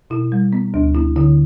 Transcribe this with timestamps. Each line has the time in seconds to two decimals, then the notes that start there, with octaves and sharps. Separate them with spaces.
0.10 B2 E4
0.32 G3
0.53 B3
0.74 D2 D4
0.95 B3 E4
1.16 D3 E4